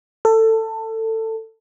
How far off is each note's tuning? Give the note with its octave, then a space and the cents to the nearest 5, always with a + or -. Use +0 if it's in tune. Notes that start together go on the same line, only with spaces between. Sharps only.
A4 +20